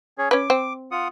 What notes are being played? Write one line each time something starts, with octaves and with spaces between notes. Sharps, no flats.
C#4 G#4 C#5
C#4 B4 D6
C4
F4 F#5 D#6